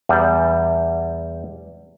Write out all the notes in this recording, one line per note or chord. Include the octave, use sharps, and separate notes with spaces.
E2 G3